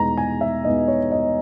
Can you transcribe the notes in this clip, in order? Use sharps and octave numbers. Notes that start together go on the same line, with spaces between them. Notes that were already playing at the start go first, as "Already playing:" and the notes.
Already playing: E2 B2 G#3 B3 D#4 A#5
G#5
E5
E2 B2 G#3 B3 D#4 D#5
C#5
D#5